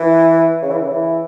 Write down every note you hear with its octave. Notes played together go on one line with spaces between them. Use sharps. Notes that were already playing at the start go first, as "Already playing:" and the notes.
Already playing: E3
C#3
E3
C#3
E3